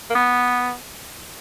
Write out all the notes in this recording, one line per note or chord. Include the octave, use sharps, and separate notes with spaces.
A#3
B3